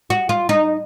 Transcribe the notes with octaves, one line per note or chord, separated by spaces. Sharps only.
F#4
F4
D#4